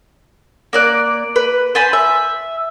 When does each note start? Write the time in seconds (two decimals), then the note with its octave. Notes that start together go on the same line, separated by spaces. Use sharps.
0.73 A#3 D5 F#6
1.36 B4
1.75 C5 G#5 A5 B5
1.93 E5